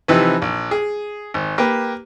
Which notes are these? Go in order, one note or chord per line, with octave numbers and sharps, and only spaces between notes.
C3 E3 F3 C4 D#4 B4
A#1
G#4
G#1
A#3 G4 B4